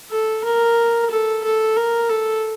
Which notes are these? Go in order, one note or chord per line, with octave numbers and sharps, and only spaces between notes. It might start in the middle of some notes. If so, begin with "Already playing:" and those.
A4
A#4
A4
A4
A#4
A4